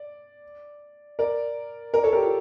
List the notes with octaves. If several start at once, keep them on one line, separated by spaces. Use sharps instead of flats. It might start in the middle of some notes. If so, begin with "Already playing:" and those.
Already playing: D5
A#4 D5
A#4 D5
A4 C#5
G4 A#4
F4 A4